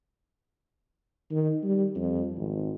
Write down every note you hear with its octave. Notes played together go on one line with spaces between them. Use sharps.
D#3
G3
F2
G#1